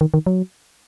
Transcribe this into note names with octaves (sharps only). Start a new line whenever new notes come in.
D#3
D#3
F#3